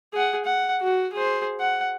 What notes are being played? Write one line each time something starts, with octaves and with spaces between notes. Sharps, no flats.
G#4 F#5
F#5
F#4
G#4 C5
F#5